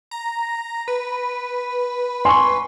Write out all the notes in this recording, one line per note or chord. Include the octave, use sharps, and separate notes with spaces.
A#5
B4
G#5 C6 C#6